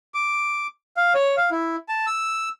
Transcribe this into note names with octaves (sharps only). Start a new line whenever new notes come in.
D6
F5
C#5
F5
E4
A5
E6